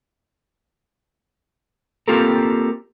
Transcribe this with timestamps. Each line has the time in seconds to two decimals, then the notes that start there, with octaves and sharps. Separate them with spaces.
2.08 A#3 C4 F4 G4 A4 A#4